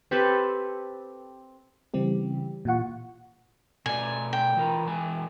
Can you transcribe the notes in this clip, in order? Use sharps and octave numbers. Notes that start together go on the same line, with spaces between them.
C4 G4 A4 B4
C#3 E3 G3 C4 G4
A#2 E3 F4 F#5 C#6
B2 A3 D5 G#5
G5
E3 F4 A#4
E3 G#3 G#5